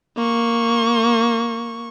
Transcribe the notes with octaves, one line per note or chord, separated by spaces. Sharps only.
A#3 C#6